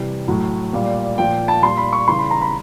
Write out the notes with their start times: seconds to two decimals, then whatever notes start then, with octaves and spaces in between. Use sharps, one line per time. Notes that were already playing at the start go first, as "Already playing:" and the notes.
Already playing: C3 E3 G3
0.28 A2 F#3
0.73 A#2 G3
1.18 A#2 F3 G5
1.48 A5
1.63 A#2 G3 C6
1.77 B5
1.93 C#6
2.08 C#3 E3 G3 C6
2.19 B5
2.31 A#5
2.42 B5